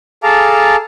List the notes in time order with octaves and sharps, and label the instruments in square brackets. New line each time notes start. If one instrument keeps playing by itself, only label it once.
[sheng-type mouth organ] G#4 A4 F5 A5 A#5 D6